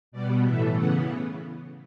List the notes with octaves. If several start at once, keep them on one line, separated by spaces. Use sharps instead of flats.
B2 G3 B3 D5
A2 E3 A3 E5
C#3 E3 B3 F#5